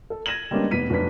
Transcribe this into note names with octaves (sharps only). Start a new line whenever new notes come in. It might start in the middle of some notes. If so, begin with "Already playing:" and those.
A4
G#6 A#6 D#7 E7 F#7
G3 G#3 A#3 B3 C#4 D4
F1 B3 B6 D#7
F1 F#3 D4 B4 B6